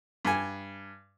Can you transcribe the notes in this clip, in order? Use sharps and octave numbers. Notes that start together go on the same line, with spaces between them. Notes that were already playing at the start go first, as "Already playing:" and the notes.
G2 G#5